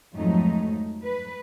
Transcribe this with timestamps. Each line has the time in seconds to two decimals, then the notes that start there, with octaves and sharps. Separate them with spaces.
0.14 F2 G#2 F#3 A3 D#4
1.03 B4